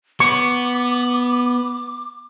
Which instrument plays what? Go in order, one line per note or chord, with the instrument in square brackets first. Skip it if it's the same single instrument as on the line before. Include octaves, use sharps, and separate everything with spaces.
[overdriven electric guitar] B3 [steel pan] C#6 [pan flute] D6